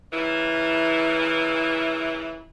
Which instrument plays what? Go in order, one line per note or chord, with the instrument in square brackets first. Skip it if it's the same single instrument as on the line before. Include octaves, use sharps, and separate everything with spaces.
[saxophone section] A#2 C#3 E3 E4